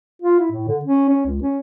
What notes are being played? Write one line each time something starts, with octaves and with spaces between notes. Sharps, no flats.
F4
E4
A2
D3
C#4
C#4
C#2
C#4